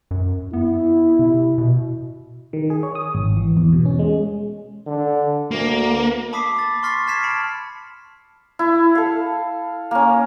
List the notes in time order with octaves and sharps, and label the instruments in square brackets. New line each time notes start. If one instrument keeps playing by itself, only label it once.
[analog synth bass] F#2
[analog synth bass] B3 [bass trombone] E4
[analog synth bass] C3
B2
[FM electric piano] D#3
G#4
C#5
D#6
G#1
E3
E2
B2
C#4
G#3
[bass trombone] D3
[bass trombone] D2 [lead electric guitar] A#3
[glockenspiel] A5 B5 D6 D#6 B6 C7
A6
C6 C#6 F6 A6 B6 C7
A5 F6 G#6 B6 C7 E7
A5 B5 C#7 D7
[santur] E4
A4 F5
A#3 C#4